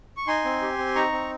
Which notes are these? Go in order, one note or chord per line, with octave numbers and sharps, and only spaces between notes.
C#6
D#4 G#5 C6
C4
G4
C4
D#4 A#5 C#6
C4